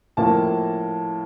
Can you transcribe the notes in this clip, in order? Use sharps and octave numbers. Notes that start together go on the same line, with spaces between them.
A2 F3 A#3 A5